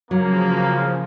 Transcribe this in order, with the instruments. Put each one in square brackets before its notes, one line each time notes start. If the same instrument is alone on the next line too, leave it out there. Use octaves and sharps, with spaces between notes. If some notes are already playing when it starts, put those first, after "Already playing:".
[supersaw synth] C#3 F3 [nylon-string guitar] F#3 [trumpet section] A#3